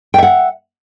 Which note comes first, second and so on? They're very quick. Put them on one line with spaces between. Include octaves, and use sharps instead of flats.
G5 E5 F#5